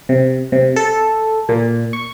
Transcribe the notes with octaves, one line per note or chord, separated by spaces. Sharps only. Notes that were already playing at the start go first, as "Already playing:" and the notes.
C3
C3
A4
A#2
C#6